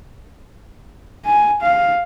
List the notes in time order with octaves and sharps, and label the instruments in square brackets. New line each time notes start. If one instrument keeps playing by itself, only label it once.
[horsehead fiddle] G#5
F5